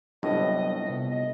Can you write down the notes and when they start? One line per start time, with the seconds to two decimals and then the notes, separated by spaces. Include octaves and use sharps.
0.23 G1 C2 A2 F#3 D4 B4 D#5
0.87 C3 B3
1.10 D#5